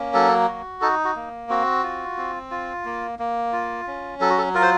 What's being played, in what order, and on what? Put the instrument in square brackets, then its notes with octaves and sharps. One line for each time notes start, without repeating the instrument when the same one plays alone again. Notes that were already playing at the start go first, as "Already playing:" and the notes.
Already playing: [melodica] A#3 C#4
F#3 A4
F#4
D#4 A4
F#4
A#3
C4 F#4
F4
C4
F4
A#3
A#3
F4
C#4
F#3 A4
F#4
A4
F4 A#4
C5